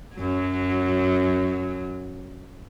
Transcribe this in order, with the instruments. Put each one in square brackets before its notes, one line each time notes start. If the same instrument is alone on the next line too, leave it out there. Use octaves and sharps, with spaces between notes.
[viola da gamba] F#2 F#3